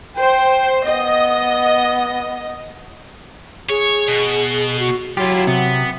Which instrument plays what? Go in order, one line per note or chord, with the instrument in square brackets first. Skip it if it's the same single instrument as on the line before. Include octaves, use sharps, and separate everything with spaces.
[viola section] C5 [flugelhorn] G5
[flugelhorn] B3 [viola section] D#5
[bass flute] G#4 [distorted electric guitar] C#5
[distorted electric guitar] B2
[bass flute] F#4
[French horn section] F#3 [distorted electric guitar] E4 F4 [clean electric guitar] G4
[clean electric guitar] C3 [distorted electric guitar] B3